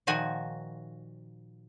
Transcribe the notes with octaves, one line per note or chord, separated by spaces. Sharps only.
A#2 D#3 F3 F#4 G#5